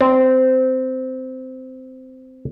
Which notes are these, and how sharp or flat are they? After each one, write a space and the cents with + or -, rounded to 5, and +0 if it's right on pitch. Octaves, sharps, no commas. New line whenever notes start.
C4 -15